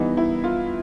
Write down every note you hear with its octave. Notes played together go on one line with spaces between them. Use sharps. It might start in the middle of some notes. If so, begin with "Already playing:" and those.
Already playing: E3 G3 B3 D#4
E4
F4